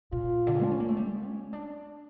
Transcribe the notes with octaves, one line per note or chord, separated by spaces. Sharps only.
A#2 F4
D3
C#3
D4
C#4
A#3
A3
G3
C#4
D4